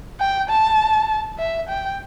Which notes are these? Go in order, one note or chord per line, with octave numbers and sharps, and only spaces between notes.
G5
A5
E5
G5